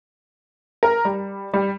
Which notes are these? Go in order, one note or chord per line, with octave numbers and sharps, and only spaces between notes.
A#4
G3
G3